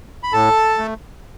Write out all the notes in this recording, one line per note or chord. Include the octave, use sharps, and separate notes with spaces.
B5
A2 A4 A5
A3